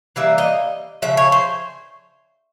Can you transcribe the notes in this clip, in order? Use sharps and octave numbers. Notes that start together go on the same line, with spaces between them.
E3 G3 A#3 E5
D#5
C#3 F3 E5
C#5
C5